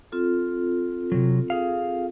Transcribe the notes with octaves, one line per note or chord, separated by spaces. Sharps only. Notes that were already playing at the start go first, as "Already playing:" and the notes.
C4 F4 A4
C3 F#3
G#4 F5